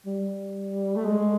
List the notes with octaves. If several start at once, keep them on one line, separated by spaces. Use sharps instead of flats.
G3
A3
G#3